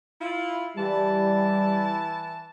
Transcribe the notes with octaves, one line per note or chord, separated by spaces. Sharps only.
E4 F4
E3 G3 E4 A5